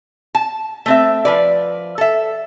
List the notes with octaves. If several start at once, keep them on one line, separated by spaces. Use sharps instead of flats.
A5
A3 C4 E5
F3 B4 D5
A4 E5